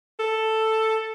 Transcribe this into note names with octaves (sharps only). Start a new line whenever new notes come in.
A4